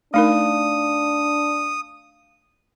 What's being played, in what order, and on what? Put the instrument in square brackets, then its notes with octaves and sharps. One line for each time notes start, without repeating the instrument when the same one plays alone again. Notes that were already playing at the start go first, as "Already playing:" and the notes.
[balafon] A3 D#4 A#4 [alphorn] D4 [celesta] F5 [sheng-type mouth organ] D#6